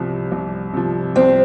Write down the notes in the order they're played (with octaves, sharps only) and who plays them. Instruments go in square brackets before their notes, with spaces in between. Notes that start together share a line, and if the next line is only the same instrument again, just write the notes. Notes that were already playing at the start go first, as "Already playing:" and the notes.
Already playing: [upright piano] C2 C3 F3
C2
C3 F3
[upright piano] C2 [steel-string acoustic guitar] C4